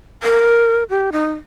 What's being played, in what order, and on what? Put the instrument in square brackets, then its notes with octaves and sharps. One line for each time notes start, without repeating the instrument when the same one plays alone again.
[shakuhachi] A#4
G4
D#4